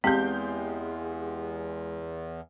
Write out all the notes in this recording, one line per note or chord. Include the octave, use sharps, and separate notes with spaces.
E2 G#3 C4 G4 F5 G6